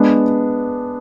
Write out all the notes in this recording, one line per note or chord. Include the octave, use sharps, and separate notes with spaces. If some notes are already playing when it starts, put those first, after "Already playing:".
Already playing: G#3 B3 D4